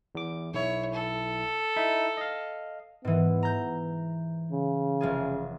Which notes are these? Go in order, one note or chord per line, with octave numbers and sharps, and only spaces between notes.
E2 D6
B1 E4 C#5
A4
D#4 E4 E5
D#5 F5
G#2 E3 B3
A#5 G6
C#3
F1 F4 G#4